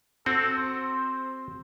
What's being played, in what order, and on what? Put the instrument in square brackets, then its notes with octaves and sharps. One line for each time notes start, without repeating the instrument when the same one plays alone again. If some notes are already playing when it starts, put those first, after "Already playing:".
[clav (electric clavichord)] C4 F#4 [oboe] A4
[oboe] C5